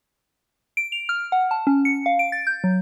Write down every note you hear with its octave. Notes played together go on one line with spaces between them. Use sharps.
D7
F7
F6
F#5
A5
C#4
C#7
F5
D7
A6
G6
F#3